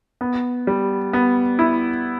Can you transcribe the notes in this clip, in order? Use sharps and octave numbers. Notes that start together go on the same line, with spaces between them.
B3
G3
B3
E4